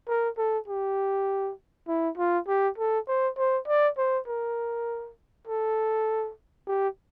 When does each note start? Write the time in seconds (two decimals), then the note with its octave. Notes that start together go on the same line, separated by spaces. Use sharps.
0.08 A#4
0.38 A4
0.68 G4
1.88 E4
2.18 F4
2.48 G4
2.78 A4
3.08 C5
3.38 C5
3.68 D5
3.98 C5
4.27 A#4
5.47 A4
6.67 G4